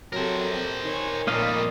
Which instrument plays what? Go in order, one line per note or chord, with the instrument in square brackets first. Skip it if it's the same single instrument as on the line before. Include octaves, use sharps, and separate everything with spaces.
[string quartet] C3 A4 G#6 [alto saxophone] F#3 [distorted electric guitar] A#4 C5
[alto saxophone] D#3 [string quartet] C#5 G#5
[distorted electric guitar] F2 G3 [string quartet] A#2 A3 [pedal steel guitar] A#3 D#5 F5